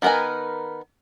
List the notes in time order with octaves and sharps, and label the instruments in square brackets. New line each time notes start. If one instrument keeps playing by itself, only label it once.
[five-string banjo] D#3 B3 A#4 B4 G#5